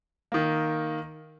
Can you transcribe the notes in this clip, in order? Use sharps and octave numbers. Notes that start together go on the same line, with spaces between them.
D#3 A#3